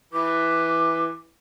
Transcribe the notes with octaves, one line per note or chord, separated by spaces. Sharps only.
E3 B4 D6